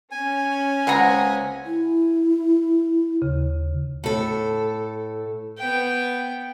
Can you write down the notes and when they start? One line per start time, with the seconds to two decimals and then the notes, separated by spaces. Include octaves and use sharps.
0.12 C#4 G#5
0.87 C#2 G#3 A#3 C4 F#5 A#5
1.66 E4
3.22 D#2 C#3
4.04 A2 A4
5.58 B3 G5